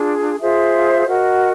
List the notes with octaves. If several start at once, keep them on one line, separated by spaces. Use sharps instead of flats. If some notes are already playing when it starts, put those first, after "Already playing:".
Already playing: D4 F4 G#4
F4 G#4 C5 E5
F#4 A#4 D#5 F#5